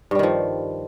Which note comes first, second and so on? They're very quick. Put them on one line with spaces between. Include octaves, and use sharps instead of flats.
G2 G3 D#3 F3